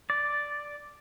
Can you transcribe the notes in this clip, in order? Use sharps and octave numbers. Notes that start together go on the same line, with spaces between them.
D5